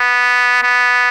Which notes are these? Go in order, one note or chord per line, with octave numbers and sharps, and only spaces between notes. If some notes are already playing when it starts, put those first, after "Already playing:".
Already playing: B3
B3